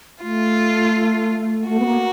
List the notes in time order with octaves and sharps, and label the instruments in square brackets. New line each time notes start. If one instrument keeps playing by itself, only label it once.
[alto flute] A3 [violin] F4
[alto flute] A3 [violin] F#4
[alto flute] B3
A#3